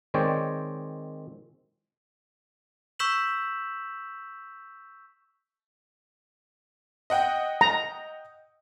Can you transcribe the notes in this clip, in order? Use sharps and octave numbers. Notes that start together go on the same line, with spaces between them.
D#3 G#3 C4 C#5 D5 G5
C#6 E6 G6 B6 E7 F#7
D#5 F#5 G5
A#5